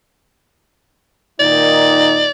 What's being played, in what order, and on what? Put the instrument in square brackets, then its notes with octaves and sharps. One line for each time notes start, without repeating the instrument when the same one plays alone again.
[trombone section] A#2 D#3 D#4 [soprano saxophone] D5